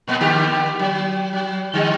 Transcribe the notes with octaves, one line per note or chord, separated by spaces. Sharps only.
A#2 A#3 B3
D3 A#3 G4
F#3
F#3
D3 G3